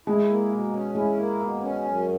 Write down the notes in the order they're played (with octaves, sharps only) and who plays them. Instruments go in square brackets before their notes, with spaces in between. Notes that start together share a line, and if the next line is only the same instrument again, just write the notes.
[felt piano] G#3 [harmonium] E4
[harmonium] A#3
B2
C#4
[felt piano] G#3 [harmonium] E4
[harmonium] A#3
B2
C#4
F#2